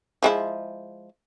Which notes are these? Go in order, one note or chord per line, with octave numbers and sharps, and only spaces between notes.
F3 G#3 E4